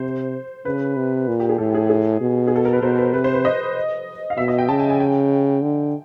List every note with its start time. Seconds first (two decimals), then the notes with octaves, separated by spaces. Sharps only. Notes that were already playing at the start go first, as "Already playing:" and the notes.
Already playing: C3 C5
0.65 C#3 B4
0.96 C3
1.28 A#2
1.40 G4
1.49 G#4
1.58 A2 A4
1.74 G#4
1.90 G#4
2.21 B2
2.47 G#4
2.56 A4
2.65 A#4
2.73 B4
2.82 B2 C5
2.98 B4
3.14 C3 B4
3.24 C5
3.34 B4
3.45 D#5
4.30 F5
4.37 B2 E5
4.48 D#5
4.58 G5
4.69 C#3 A5
4.79 G#5
4.90 G#5
5.00 G5
5.62 D3